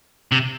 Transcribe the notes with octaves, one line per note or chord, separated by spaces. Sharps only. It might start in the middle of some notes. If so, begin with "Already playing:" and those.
C3